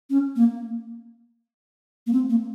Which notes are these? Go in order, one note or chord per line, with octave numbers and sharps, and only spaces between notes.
C#4
A#3
A#3
C4
A#3